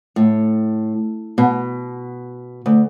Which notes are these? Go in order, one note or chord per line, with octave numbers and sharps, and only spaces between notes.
A2
B2
D2